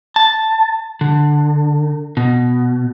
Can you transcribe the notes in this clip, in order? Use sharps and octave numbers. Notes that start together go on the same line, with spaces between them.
A5
D3
B2